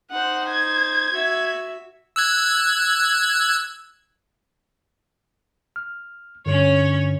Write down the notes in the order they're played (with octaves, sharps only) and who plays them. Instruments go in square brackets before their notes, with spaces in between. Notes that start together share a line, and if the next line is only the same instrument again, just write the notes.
[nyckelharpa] D#4 C5 [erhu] F#5
[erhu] G#6
[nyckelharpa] F#4 E5
[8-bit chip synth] E6 F#6 G#6
[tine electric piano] F6
[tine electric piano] G2 D3 [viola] C#4 C#5